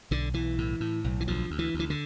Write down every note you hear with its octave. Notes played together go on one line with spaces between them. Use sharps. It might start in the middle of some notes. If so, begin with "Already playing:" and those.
B1 D3
B1 E3
A2
A2
B1
E3
D2 F3
D2
E3
D2
E3
D3